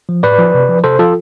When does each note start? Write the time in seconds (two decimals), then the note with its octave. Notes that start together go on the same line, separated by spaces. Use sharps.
0.09 F3
0.23 A2 B4 D5
0.38 F3
0.54 C3
0.69 F3
0.84 C3 A4 C5
0.99 F3 F4 A4